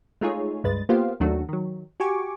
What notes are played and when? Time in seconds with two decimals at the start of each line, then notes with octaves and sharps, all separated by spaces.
0.21 G#3 A3 D#4 F4 G#4 C#5
0.64 C#2 G2 G#3 B4 A6
0.89 A#3 B3 F4 G4 C5 F5
1.20 D#2 D#3 F#3 A3 D4 F#4
1.49 D#3 F#3
2.00 F#4 G4 G#5 C#6 D6